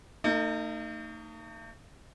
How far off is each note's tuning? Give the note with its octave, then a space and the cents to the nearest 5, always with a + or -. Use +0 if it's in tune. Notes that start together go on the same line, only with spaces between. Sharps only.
A3 +45 D#4 -10